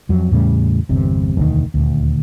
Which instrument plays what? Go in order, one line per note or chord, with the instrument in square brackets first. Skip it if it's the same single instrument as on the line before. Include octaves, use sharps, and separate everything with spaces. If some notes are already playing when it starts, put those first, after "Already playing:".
[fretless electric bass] F2 F#3
E2 A2 C#3 G3
G1 E2 C3
E1 D2 C3 D#3
D#1 D2